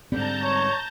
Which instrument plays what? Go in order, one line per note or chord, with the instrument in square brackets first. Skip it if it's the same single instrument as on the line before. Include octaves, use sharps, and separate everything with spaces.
[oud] G#2 D3 G3 [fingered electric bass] C4 [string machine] A5 A#5 G6
[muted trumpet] C#5